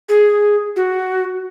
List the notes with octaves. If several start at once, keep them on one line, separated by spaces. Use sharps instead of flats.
G#4
F#4